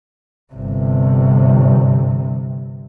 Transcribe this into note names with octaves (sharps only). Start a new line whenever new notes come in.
G1 C3